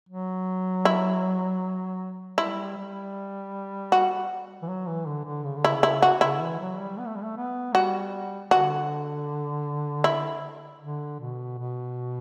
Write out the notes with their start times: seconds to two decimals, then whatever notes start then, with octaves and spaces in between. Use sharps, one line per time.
0.09 F#3
0.85 E4
2.38 G3 E4
2.77 G3
3.92 F#4
4.62 E3
4.68 F#3
4.87 E3
5.06 D3
5.25 D3
5.44 C#3
5.56 D3
5.65 C#3 E4
5.83 E4
6.02 F#4
6.21 C#3 E4
6.41 E3
6.59 F#3
6.79 G3
6.99 B3
7.06 A3
7.16 G3
7.23 A3
7.37 B3
7.74 G3 F#4
8.51 D3 F#4
10.04 E4
10.81 D3
11.20 B2
11.58 B2